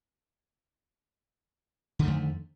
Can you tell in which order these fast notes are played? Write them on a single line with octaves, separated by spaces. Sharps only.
D3 D#3 A3 F2